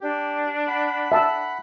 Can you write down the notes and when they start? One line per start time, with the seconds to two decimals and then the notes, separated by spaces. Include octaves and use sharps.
0.01 D4 G4
0.67 F#5 B5
1.12 E5 A5 E6